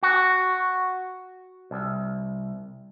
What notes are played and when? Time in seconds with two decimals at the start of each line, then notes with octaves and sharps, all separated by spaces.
0.03 F#4
1.71 C2